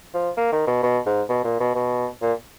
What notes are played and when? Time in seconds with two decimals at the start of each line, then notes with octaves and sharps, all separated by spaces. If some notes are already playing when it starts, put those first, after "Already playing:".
0.14 F3
0.37 A#3
0.52 D#3
0.67 B2
0.83 B2
1.06 G#2
1.29 B2
1.44 A#2
1.60 B2
1.75 B2
2.22 A#2